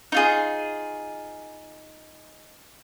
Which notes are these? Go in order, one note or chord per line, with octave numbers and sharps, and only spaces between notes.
D#4 F4 G#4